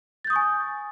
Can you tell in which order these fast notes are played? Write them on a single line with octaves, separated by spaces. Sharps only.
A6 G6 D#6 C#6 G#5